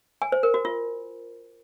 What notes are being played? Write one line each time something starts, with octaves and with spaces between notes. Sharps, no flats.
G#5
C5
A#4
F#4
F4